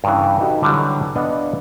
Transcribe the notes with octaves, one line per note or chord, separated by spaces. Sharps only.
G2 C#3 E3
D#4 F#4 G4 A4 B4
D3 E3 F#3 G3
B3 D4 D#5 F5 F#5